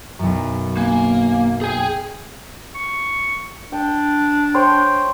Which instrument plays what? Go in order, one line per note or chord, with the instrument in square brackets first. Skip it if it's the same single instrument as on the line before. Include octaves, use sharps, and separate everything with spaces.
[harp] B1 F#2
[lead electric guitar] A#3 [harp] G#5
[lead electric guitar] G#4 G#5 [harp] G5
[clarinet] C#6
[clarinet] D4 [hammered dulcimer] G5
[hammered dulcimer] C5 C#5 G5